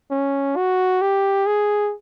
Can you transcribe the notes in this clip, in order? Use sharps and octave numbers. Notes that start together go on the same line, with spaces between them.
C#4
F#4
G4
G#4